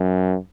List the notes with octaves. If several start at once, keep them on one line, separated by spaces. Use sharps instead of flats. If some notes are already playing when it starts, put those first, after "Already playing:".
Already playing: F#2